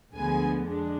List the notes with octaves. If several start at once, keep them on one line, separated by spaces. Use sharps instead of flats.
D2 D3 F3 G#3 B3 G#5
F2 F3 G#3 D4